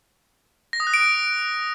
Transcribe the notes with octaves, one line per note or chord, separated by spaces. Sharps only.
A#6
D#6
F#6
D7